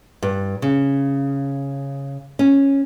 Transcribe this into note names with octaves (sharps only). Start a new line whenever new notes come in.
G2
C#3
C#4